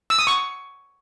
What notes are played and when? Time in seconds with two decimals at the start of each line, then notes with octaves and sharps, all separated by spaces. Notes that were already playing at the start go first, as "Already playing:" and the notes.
0.10 E6
0.19 D#6
0.27 C#6